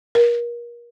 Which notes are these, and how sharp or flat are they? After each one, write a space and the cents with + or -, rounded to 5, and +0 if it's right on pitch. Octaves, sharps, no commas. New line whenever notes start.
A#4 +30